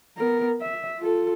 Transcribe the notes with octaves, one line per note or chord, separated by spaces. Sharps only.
B3 A#4
E5
F4 A4